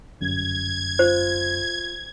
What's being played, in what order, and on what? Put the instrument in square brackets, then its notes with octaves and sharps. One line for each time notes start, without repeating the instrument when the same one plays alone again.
[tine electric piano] G1 F#2 [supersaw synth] G#6
[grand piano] F4 [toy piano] C5